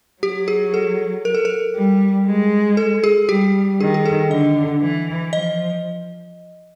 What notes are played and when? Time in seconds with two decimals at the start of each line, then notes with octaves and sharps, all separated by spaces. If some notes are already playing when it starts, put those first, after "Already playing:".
0.22 F#3 G4
0.48 G#4
0.74 A4
1.25 A#4
1.35 A4
1.45 A#4
1.75 G3
2.27 G#3
2.77 A4
3.04 G#4
3.29 G3 G4
3.80 D#3 G#4
3.94 G#4
4.06 A4
4.30 D3 D#5
4.81 E3
5.33 F3 D#5